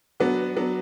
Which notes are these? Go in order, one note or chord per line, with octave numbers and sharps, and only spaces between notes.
F#3 B3 D4 F#4
F#3 B3 D4 F#4